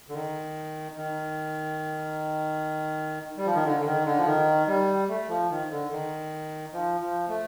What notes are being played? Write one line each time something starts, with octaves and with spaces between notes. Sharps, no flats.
D3
D#3
D#3
G3
F3
D#3
D3
D3
D#3
D3
F3
D#3
G3
A3
F3
D#3
D3
D#3
F3
F3
A3